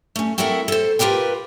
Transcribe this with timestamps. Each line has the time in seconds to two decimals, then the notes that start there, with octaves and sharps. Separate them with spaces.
0.16 A3 C#4
0.38 C4 E4 F#4 A4 A#4 E5
0.68 A4 C5
0.99 F4 G4 A#4 B4 G5